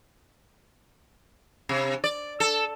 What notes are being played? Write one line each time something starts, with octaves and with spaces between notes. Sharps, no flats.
C3
D5
A4